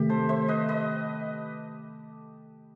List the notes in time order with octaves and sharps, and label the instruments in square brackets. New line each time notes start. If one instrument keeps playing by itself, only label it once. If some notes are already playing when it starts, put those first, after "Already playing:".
Already playing: [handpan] C3 D#3 A3 [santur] G4
[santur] A4 C5
C5 E5
B4 D#5
B4 D#5